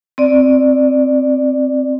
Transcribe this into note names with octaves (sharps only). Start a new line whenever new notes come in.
C4 D5